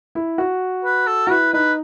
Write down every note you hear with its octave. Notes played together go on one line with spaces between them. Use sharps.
E4
F#4
B4
A4
F#4
E4 B4
D#4 B4